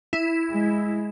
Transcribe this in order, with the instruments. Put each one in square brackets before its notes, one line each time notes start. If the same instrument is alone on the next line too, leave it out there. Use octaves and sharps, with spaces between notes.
[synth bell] E4
[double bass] G#3